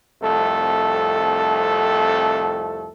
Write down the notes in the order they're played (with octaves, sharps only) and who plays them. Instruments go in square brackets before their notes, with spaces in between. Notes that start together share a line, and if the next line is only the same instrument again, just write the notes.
[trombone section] C2 F2 A3 A4